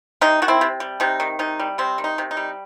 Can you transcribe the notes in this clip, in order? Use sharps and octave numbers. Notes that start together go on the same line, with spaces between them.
C3 D#4
D#3 F#4
C4 E4
C3
G3
C3 D#4
D#3
C3 D#4
G3
C3 C4
D#3
D#4
C3
D#4
G3